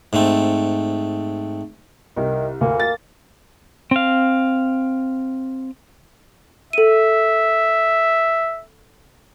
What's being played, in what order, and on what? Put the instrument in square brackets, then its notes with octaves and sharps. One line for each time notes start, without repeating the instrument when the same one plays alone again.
[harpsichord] G#2 A3 C4
[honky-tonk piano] C2 [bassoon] D#3
[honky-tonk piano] D2 [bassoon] A#3
[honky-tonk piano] A6
[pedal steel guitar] C4 F5
[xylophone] A4 D#7 [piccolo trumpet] E5